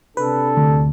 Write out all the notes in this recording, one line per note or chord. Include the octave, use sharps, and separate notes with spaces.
C3 D4 A4 B4
D2